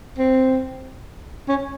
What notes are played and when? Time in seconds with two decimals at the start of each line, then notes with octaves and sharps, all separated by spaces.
0.18 C4
1.49 C#4